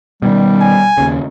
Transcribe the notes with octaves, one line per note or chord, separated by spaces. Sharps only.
B2 D#3 G3
G#5
D#2 C#3